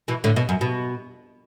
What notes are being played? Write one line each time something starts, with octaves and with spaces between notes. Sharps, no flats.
B2 E3
A2 D3
B2
F#2
B2